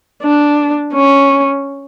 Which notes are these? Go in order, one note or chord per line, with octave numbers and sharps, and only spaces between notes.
D4
C#4